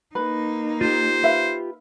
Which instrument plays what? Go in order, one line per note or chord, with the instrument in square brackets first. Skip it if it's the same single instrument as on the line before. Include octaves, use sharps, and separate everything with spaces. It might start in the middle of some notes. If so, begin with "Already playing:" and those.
[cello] A#3 D#4 [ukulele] B4
[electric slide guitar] F4 G4 [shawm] C5
[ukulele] B4 E5 F5